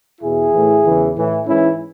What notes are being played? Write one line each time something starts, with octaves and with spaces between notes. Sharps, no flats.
E2 B2 E4 G#4
A2 E3
E2 C#3 E3
A2 E3
G#2 E3 C#4 E4